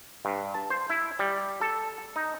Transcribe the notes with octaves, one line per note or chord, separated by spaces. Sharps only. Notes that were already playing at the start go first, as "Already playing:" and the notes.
G2
A5
C5
E4
G3
A4
D#4